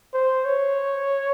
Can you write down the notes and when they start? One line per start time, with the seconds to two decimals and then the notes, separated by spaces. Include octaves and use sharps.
0.14 C5
0.45 C#5